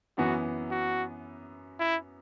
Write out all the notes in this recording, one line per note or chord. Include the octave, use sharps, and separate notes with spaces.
F#2 E3 B3 F#4
F#4
E4